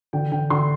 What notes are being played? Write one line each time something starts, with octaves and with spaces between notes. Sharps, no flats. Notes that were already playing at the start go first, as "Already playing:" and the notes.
D3 G5
D3 G5
D3 C6